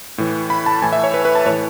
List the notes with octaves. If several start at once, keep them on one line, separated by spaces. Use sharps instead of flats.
A2 E3
B5
A5
A2 E3 G#5
E5
C#5
B4
B4
A5
A2 E3 C#5